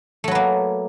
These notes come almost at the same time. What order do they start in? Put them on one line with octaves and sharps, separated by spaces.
A3 F#3 B4 A#3